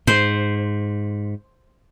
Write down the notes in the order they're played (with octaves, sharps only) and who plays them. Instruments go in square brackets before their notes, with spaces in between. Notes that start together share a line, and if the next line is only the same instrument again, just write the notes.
[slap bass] G#2 [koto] C5